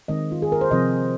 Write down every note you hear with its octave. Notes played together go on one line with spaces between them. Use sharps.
D#3 G#3 C4 D#5
F4
G#4
A#4
C5
C3 F3 C4 D#5